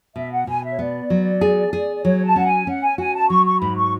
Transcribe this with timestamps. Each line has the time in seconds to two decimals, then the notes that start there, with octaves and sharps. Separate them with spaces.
0.16 B2 E5
0.32 F#5
0.47 B2 G#5
0.64 E5
0.71 C#5
0.79 B3 D5
1.10 F#3
1.41 G#4
1.73 G#4
1.96 D5
2.04 F#3 C#5
2.25 A5
2.36 C#4 F#5
2.45 G#5
2.67 C#4 F#5
2.82 G#5
2.98 F#4 G#5
3.15 A5
3.30 F#3 C#6
3.46 C#6
3.60 G#2 B5
3.76 C#6